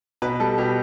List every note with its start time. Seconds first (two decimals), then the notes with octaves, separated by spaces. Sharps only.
0.22 B2 B4
0.40 G3 A4
0.58 B2 G4